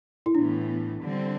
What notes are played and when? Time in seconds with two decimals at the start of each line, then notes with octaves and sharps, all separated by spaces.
0.26 E4
0.35 A2 E3 B3 D4
1.02 D3 G3 C4